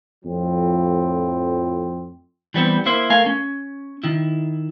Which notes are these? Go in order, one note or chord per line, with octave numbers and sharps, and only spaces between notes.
F2 A2 F3 C4
E3 G3 B3 C4
A#3 E4 C5 E5
A3 A#4 F5 G#5
C#4
D#3 E4